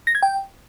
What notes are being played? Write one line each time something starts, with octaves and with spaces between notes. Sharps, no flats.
A#6
G#6
G5